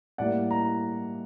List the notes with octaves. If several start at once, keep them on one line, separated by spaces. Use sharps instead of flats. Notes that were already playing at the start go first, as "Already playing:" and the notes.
A2 G3 A#3 D5 F#5
A#5